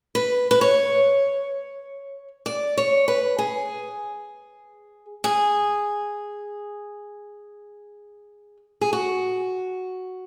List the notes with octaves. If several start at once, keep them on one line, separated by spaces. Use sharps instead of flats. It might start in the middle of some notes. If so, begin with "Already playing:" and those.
B4
B4
C#5
D5
C#5
B4
G#4
G#4
G#4
F#4